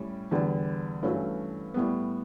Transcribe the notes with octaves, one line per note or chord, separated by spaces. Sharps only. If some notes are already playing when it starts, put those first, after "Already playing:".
Already playing: A2 G3 C#4
E2 D3 G3
G2 E3 A3 C#4 F#4
A2 G3 B3